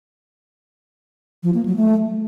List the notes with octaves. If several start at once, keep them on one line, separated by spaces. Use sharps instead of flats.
F3
A#3
F#3
A3